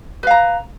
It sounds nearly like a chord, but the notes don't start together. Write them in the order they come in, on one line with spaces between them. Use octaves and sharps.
B4 F5 A#5